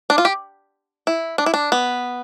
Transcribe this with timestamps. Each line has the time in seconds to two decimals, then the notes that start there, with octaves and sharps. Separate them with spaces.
0.10 D4
0.18 F4
0.25 G4
1.07 E4
1.38 D4
1.46 E4
1.54 D4
1.72 B3